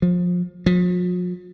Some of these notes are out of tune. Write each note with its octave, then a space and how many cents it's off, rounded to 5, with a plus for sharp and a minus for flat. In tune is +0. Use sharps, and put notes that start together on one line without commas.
F3 +25
F3 +45